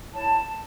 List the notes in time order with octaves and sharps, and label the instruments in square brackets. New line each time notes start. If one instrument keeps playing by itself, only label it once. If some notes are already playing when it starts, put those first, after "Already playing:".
[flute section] E4 C#5 A5